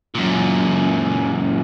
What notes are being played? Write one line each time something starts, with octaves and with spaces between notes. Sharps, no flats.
F#2 A#2